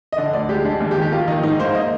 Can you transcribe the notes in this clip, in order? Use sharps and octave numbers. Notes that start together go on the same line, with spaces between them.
D#5
D3 D5
D2 D5
G#3 G4
G#3 D4
D#2
G4
D#3
G4
A#3 F4
D#3 D#4
G#2 D#4
A#3 C5
D#5